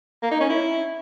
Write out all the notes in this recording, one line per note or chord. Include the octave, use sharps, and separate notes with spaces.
A#3
D#4
C#4
E4